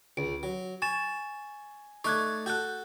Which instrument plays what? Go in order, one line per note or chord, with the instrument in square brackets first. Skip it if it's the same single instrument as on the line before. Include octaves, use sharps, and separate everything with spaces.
[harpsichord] C#2 [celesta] D7
[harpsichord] F#3
[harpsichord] G#5 [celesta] C#6 A6 E7
[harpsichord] A3 D#4 D5 [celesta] C#6 F#6 G#6
[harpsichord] F#4 A4 [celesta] F#6 G6